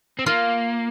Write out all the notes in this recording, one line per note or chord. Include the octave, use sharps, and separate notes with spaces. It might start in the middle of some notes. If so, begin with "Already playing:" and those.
C4
A#3 F4